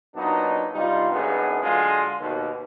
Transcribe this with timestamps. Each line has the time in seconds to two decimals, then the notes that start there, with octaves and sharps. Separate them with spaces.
0.15 A#2 F#3 B3 D4 D#4
0.73 G2 C3 G3 D#4 F4
1.12 F#2 A2 B3 D4 D#4 G#4
1.62 D3 F#3 G#3 F4
2.20 D#2 B2